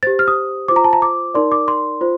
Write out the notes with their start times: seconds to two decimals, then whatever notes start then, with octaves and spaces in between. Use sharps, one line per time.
0.03 G4 C5 A6
0.19 F6
0.28 D#6
0.68 F4 C5 D6
0.76 A#5
0.84 A5
0.93 A#5
1.02 D6
1.34 D#4 A#4 D5 C6
1.52 D6
1.68 C6
2.01 F4 C5